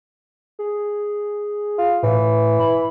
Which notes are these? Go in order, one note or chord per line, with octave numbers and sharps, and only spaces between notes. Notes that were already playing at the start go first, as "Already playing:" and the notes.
G#4
F4
A2 E3
B5